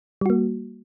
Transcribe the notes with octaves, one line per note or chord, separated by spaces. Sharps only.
G3 A#3 F#4